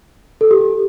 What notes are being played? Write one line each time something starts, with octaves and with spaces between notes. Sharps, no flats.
A4
G4